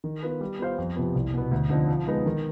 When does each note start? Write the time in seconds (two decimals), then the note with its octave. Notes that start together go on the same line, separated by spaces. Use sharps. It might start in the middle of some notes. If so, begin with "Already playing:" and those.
0.04 D#3
0.23 B3 F4 B4
0.41 G3
0.59 B3 F4 C5 F5
0.78 F2
0.96 C3 F3 B3
1.15 C2
1.34 B2 B3
1.51 D2
1.70 D3 F3 C4 D#4
1.89 F3
2.07 G#3 B3 D#4 B4
2.26 D#3